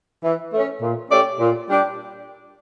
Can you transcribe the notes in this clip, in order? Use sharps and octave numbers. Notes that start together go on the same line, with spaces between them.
E3
A3 C#4
A#2
A3 C#4 G4 D5
A#2
G3 D4 G4